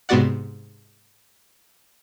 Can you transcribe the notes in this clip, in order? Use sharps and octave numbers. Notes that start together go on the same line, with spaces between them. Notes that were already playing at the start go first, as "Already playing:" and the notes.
G#2 C3 B3 F#4 D5 F#5